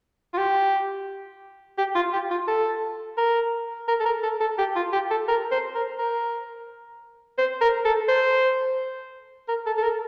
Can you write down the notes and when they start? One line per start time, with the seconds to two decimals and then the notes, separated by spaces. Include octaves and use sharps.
0.33 F4
0.38 G4
1.78 G4
1.95 F4
2.13 G4
2.31 F4
2.48 A4
3.18 A#4
3.88 A#4
4.00 A4
4.06 A#4
4.23 A4
4.40 A4
4.58 G4
4.76 F4
4.93 G4
5.10 A4
5.28 A#4
5.51 C5
5.75 A#4
5.99 A#4
7.38 C5
7.61 A#4
7.85 A4
8.08 C5
9.48 A#4
9.66 A4
9.78 A4
9.83 A#4